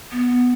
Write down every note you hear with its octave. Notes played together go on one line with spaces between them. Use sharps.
B3